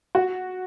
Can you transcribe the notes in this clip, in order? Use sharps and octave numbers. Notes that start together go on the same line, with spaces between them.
F#4